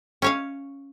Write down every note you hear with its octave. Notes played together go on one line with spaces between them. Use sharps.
C#4 C#5 F5